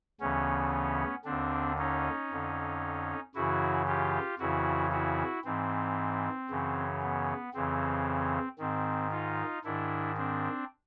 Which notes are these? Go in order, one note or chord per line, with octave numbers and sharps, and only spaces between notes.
D2 C#3 E3 B3 C#4
D#2 D3 C4 D4
C#4 D#4
F2 D3
F#2 C#3 E3 E4 F#4
F4 G4
F2 C#3 E3 E4 F#4
E4 F#4
G#2 E3 C4
F#2 C#3 E3
B3
F2 C#3 E3 C4
G#2 D#3 C4
D#4 F4
G#2 D#3 D4 E4
C4 D4